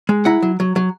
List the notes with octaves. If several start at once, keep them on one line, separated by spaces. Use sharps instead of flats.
G#3
E4 F#5 A#5
F#3
F#3
F#3